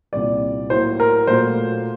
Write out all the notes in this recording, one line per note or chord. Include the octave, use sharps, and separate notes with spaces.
C2 A#2 G3 D5
A2 F#3 A#3 C5
A#4
A#2 F#3 A3 C5